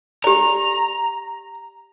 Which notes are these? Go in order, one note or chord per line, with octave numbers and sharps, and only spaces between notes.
G4 D5 A#5